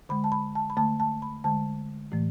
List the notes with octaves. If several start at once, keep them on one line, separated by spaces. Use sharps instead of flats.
D3 G#3 B5
A5
B5
A5
B5
D3 A3 A5
A5
B5
D3 G#3 A5
A2 E3 A3